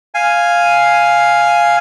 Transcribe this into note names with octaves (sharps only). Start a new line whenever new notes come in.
F5 G#5